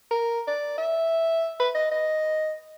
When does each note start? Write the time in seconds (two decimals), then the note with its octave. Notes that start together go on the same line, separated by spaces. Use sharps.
0.11 A#4
0.47 D5
0.78 E5
1.60 B4
1.75 D#5
1.91 D#5